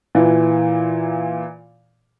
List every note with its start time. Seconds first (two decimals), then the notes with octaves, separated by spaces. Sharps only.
0.15 A#2 E3